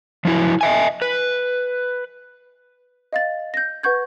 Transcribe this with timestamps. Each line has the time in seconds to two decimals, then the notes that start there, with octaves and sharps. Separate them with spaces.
0.25 F3 F#3 E4
0.61 D#5 E5 G#5
1.02 B4
3.13 D#5 F5 A6
3.54 G6 A#6
3.83 B4 F#5 C#6 G6 G#6